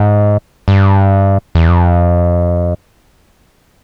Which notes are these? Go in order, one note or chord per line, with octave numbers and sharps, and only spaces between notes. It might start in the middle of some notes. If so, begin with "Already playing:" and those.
Already playing: G#2
G2
E2
F2